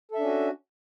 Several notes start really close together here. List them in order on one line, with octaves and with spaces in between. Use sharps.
A4 E5 D4 C#4 F#4